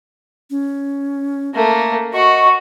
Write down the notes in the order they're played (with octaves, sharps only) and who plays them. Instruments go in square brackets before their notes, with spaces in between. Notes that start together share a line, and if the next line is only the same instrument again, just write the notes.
[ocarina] C#4
[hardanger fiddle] A3 A#3
[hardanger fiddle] F#4 [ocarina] D#5 [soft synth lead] C#6